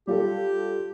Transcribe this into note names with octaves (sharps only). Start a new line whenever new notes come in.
G3 F4 G4 A4